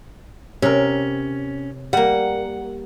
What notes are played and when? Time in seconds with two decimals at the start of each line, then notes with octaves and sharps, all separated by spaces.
0.62 C3 C#4 A#4
1.93 G3 A#3 F#5